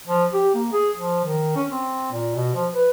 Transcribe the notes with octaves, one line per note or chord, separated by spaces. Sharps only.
F3
G4
A#3
G#4
F3
D#3
C#4
C4
A#2
B2
F3
B4